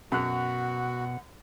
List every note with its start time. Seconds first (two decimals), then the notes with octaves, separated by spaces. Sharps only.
0.12 F#2 B2 F#4 F#5 F#6